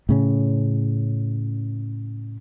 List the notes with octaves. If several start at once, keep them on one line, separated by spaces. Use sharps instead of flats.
A2 C#3 C#4